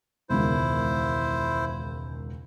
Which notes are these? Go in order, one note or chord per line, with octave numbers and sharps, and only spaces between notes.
E1 C#2 D#3 E4 C5